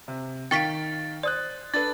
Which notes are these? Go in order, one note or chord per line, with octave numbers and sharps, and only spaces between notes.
C3
D#3 F5 G5 C#6 A6 B6 D7
C5 D5 D#6 F#6
D4 A4 B4 A6